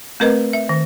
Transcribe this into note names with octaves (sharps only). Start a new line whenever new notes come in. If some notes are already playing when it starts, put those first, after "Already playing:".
A3 C4 A#4 B4 D#5
E5
D#3